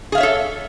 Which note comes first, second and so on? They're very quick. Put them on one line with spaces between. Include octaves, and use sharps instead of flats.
G#4 F5 E5 C#5 A4